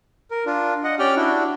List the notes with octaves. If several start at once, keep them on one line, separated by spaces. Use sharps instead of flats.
A#4
D4 F4
D#5 F#5
C#4 G4 D5 G5 F6
D4 E4 F#4